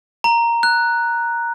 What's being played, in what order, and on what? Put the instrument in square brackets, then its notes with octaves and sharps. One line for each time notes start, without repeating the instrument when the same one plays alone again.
[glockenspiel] A#5
F#6